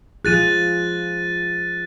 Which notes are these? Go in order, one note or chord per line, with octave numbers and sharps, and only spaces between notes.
F3 F4 G#4 F#6 A6 D#7